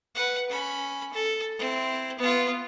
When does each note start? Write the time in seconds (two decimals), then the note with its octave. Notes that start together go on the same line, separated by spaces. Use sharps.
0.15 B4 F#5
0.50 C#4 B5
1.13 A4
1.59 C4 E4
2.18 B3 F4